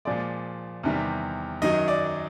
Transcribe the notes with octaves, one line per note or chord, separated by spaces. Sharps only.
A#2 F3 G#3 D5
E2 C3 D#3 G3
F#2 D#3 F#3 D#5
D5